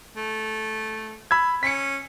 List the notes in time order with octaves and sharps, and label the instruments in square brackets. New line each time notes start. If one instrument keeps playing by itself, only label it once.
[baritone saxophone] A3
[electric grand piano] B5 E6 G#6
[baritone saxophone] C#4 [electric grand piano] B6 C#7